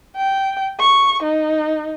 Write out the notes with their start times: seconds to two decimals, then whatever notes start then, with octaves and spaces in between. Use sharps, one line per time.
0.16 G5
0.80 C#6
1.22 D#4